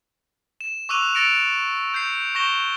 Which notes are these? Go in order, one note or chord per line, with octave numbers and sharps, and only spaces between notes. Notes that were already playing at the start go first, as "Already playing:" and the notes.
E7
C#6 D6 E6 F#6 D#7 F7
E6 A6 A#6 C#7 D7 F7
G6 C7
C#6 G6 A#6 E7 G7